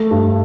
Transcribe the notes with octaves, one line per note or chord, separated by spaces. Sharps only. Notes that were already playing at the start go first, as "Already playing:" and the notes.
Already playing: A3
G2